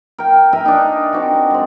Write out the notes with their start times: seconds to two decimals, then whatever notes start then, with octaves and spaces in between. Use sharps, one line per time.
0.18 A#4 G5
0.53 A#4 E5 G5 G#5
0.65 D4 D#4
1.13 C4 D4 F#4
1.51 G#3 C4